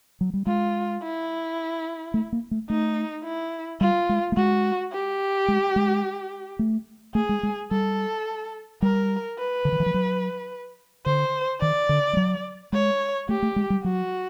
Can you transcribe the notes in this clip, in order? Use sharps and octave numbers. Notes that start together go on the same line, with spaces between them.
F#3
G3
G#3 F4
E4
A3
A#3
A3
A3 D#4
E4
G3 F4
G#3
A3
G#3 F#4
G4
G#3
G#3
A3
A3 G#4
G#3
G#3
G3 A4
G3 A#4
B4
D3
D#3
E3
F3
F#3
D3 C5
D#3 D5
D3
G3
F#3
G#3 C#5
A3 G4
A3
G#3
G3
F#3 F#4